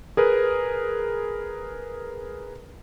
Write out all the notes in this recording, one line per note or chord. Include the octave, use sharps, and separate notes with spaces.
G#4 A#4 B4